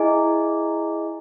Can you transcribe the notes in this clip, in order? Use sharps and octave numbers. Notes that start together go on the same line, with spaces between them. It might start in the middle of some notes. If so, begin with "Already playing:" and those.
Already playing: E4 G#4 D#5 G#5